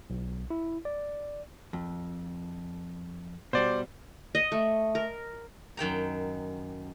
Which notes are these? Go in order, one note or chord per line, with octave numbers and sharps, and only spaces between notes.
B1
E4
D5
F2
B2 G3 C5 D5
D#5
A3
A#4
F#2 D#3 G5 A#5